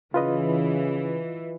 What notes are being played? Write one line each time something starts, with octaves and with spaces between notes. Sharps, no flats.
C#3 E3 F4 B4 D#5